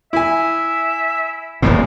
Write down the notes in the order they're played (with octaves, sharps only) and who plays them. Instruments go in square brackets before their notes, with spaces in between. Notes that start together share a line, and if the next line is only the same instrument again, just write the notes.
[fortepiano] E4 G#5 [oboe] E5
[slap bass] D#1 E2 A2